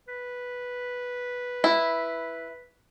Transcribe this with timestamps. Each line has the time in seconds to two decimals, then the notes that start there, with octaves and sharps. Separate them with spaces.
0.08 B4
1.64 E4